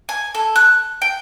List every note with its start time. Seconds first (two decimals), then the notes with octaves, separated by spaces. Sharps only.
0.09 G#5
0.34 A4
0.56 F#6
1.02 G5